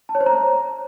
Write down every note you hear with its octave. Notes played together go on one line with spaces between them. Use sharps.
A5
C#5
C5
A#5